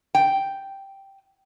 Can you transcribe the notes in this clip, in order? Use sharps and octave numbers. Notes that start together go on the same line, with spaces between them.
G5